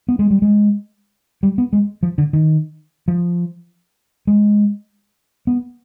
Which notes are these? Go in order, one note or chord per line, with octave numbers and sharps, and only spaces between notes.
B3
G#3
G3
G#3
G3
B3
G#3
F3
D3
D#3
F3
G#3
B3